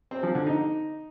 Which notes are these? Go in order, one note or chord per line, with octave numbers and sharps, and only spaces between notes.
C4
F3
D3
D#4